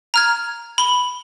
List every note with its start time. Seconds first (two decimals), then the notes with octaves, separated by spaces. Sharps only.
0.14 A#5 F6 G#6
0.78 B5 G7